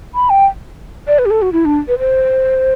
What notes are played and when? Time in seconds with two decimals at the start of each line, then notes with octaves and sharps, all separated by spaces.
0.15 B5
0.30 G5
1.07 D5
1.19 B4
1.26 G4
1.31 A4
1.42 F#4
1.52 E4
1.65 D4
1.88 B4
1.99 C5